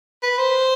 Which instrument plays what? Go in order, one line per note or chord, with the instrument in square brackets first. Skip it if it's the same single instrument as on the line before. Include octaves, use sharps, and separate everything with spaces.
[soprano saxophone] B4
C5